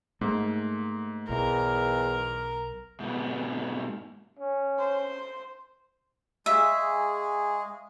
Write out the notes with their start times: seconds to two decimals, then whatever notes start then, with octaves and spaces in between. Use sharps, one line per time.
0.21 G#2 A3 A#3
1.29 B1 E2 A#4
3.00 G#2 B2
4.39 C#4
4.78 C5
6.46 G#3 G#4 E5 F5 C#6